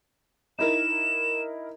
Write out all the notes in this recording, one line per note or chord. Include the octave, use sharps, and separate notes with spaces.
D#4 E4 A#4 E7